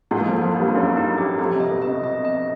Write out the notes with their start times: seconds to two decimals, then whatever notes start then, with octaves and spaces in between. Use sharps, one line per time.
0.11 G#2 G#3 A#3
0.20 E3
0.28 F2 F3
0.33 A#3
0.43 F2 F3
0.54 A#3
0.59 G2 G3
0.75 F#2 F#3 D#4
0.97 D#4
1.18 G4
1.39 F2 F3 G4
1.55 C3
1.60 D#5
1.71 B2
1.82 C3 D#5
2.04 D#5
2.25 D#5